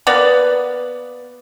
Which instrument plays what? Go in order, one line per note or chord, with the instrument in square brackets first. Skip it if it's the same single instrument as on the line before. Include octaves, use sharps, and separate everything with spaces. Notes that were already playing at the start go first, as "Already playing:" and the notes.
[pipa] A#3 B3 B4 D5